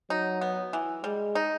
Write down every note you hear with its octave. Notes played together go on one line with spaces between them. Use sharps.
F#3 D#4
B3
E3
G3 G#3
D#4